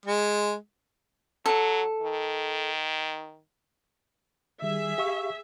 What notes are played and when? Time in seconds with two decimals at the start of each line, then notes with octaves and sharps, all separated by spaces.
0.06 G#3
1.46 F#3 A4
2.02 D#3
4.62 D#3 G3 G#4 E5
4.98 G4 F5 C#6